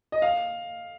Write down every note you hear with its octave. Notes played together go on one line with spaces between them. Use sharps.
D#5
F5